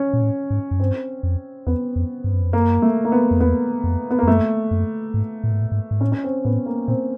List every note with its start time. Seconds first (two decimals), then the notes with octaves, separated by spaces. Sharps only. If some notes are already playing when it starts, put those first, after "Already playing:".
Already playing: C#4
0.13 A#2
0.22 A2
0.50 G#2
0.71 F#2
0.79 G2 C4
1.23 F2
1.67 E2 B3
1.96 F2
2.24 G2
2.34 F#2
2.42 F2
2.52 F#2 A#3
2.82 A3
3.05 A#3
3.12 B3
3.31 F2
3.40 E2 B3
3.84 F2
4.11 B3
4.19 A#3
4.23 F2
4.27 F#2 A3
4.71 F#2
5.14 G#2
5.44 A2
5.52 G#2
5.61 A2
5.72 G#2
5.91 G#2
6.01 A2 C#4
6.12 C#4
6.23 C4
6.45 A2 B3
6.66 A#3
6.88 A#2 C4